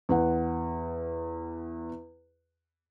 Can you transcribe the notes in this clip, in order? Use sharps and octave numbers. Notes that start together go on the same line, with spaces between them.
E2 B4 F#5